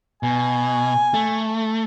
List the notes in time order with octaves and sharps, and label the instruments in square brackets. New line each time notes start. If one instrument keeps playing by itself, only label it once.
[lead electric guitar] B2 [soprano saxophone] G#5
[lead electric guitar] A3